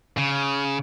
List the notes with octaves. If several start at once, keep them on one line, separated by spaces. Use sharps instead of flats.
C#3